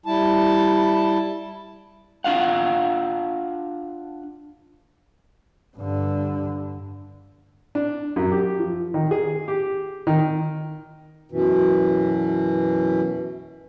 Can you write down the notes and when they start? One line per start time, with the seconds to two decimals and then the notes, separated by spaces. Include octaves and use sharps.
0.06 G3 E4 A5
2.24 D4 F4 F5 F#5
5.77 G2 D3
7.75 D4
8.16 F#2
8.32 G4
8.59 F3
8.94 D#3
9.11 G#4
9.48 G4
10.07 D#3
11.32 F#2 B2 E3